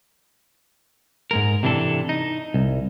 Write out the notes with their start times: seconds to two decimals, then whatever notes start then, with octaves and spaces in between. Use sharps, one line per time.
1.31 G#2 G#3 A#4
1.63 C3 E3 D4 A4
2.09 D#4
2.54 C2